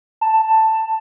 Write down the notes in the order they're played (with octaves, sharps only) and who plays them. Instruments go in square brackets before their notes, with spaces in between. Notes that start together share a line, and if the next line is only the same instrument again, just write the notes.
[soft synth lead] A5